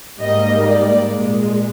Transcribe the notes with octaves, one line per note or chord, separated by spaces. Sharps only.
G#2 G3 A#3 D#5
D5
A#2 G#3